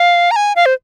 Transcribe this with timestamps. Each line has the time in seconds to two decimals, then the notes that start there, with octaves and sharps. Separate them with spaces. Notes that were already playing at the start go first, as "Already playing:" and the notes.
Already playing: F5
0.31 A#5
0.36 G#5
0.56 F5
0.66 C5